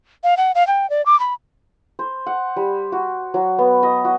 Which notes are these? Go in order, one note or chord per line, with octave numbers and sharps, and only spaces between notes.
F5
F#5
F5
G5
D5
D6
B5
C5
F#5
G3
F#4
F#3
B3
D#5
F#4